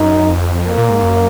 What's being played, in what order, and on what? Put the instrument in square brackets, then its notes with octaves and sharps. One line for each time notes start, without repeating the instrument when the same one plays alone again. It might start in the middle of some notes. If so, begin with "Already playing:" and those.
Already playing: [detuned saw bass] F#2 [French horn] D#4
[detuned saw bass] F2
[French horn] A#3
[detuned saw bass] A#2
G#2
F#2